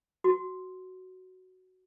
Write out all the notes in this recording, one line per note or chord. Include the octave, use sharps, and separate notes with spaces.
F#4